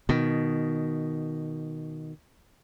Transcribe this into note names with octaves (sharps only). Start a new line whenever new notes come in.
B2 D#3